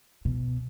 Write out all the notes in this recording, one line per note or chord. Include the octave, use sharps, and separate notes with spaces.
B2